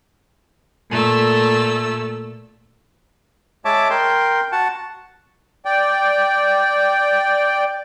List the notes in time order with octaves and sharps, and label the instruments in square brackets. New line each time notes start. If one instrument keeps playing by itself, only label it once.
[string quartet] A#2 A3 E6
[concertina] G#3 C#5 E5 A5 D6
A#4 G5 C6
F#4 F#5 A5
[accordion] D5 G5